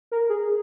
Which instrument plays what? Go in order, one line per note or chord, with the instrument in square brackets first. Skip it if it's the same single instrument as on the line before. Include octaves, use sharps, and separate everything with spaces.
[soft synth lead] A#4
G#4